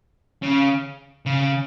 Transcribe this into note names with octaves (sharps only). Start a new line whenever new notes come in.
C#3
C#3